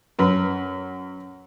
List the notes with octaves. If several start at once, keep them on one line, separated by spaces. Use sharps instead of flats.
F#2 B4